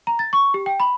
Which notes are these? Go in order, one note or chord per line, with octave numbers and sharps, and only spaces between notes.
A#5
A6
C#6
G4
G5
B5